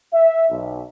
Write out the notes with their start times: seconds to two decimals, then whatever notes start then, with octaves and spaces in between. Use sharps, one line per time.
0.12 E5
0.49 B1